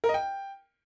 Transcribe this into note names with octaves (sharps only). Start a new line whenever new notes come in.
A#4
D#5
G5